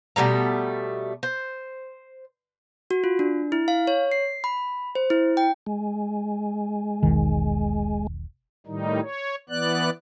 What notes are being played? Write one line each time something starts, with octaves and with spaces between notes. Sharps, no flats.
B2 G3 A3 A#5
C5
F#4
F4
D4
E4
F5
C#5
C7
B5
C5
E4
G5
G#3
E1 B1 D#3
A2 D#3 G3 D#4
C#5
E3 B3 D5 F#6